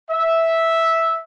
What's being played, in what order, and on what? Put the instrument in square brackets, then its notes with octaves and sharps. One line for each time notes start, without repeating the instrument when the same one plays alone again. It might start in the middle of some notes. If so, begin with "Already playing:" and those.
[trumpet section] E5